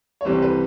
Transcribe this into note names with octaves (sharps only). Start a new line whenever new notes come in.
C#5
C2 C3 E3 G3 C4 C5
B4